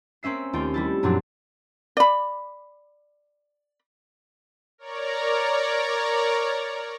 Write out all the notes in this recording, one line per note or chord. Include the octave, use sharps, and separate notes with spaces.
A#3 C4 C#4 E5 C7
D#2 A3 F4 G5
G3 E4 A4
F#2 A#2 F3 F#3 C4 D4
D5 B5
A#4 C#5 D5 A#5